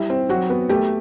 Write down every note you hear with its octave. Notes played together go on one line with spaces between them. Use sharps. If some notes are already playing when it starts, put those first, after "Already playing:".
Already playing: G3 E4 E5
C4
F#3 F#4 F#5
B3
A3 G4 G5